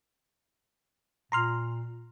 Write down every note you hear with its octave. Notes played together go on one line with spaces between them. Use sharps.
A#2 A#5 C6 F6